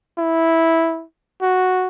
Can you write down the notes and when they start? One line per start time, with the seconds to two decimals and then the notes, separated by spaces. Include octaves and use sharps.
0.18 E4
1.42 F#4